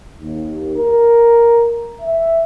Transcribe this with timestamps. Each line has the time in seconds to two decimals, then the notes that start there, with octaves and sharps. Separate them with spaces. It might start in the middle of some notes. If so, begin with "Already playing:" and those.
0.19 D#2
0.77 A#4
2.02 E5